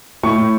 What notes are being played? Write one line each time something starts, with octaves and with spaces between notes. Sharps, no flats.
A2 C#6
A2